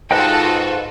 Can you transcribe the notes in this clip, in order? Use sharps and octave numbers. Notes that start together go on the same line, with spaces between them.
G#2 F4 F#4 A4 B4 D#5 G5